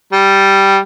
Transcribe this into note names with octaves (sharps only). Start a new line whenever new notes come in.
G3